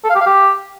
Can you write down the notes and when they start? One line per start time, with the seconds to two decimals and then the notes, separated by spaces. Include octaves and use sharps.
0.04 A4
0.10 F5
0.15 G4
0.21 F5
0.26 G4